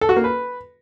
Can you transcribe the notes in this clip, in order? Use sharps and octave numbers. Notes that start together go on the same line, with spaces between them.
A4
F#4
A#3
B4